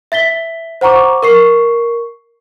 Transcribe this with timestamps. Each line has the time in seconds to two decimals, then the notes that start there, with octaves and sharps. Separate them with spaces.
0.12 E5 A6 B6 G7
0.81 C5 F#5 A#5 C#6 D6
1.23 A#4 C#6 C7